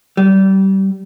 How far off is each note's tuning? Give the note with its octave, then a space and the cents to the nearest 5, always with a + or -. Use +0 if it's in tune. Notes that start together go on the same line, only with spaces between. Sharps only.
G3 -25